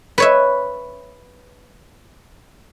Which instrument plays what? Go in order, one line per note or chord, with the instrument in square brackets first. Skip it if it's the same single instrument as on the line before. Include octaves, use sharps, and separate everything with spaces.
[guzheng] B4 C#5 E5